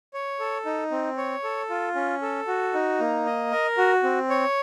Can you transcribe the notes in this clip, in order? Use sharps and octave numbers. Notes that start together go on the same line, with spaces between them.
C#5
A4
D#4
C4
C#5
A4
F4
C#4
A4
F#4
D#4
A#3
D#5
A#4
F#4
C4
C#5